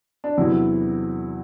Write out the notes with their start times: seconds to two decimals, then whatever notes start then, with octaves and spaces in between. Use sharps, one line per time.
0.24 D4
0.37 E2 C3 F#3 C4 E4